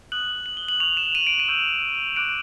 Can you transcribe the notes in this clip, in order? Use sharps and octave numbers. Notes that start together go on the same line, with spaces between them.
D#6 F#6 F#7
F#7
G7
F#7
C#6 F#6 F7
E7
D#7
D7
D#7
C#6 E6 G6
D6 F#6 D7